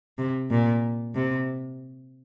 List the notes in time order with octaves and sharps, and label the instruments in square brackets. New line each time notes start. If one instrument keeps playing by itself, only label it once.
[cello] C3
A#2
C3